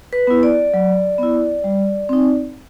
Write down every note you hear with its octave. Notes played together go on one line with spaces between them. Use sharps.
B4
B3 E4
D5
F#3
B3 E4
G3
C4 D#4